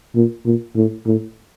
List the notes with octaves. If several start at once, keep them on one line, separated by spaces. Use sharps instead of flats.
A#2
A#2
A2
A2